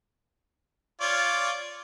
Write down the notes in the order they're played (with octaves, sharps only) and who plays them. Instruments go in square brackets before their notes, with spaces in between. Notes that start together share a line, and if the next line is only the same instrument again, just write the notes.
[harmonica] F4 C#5 D5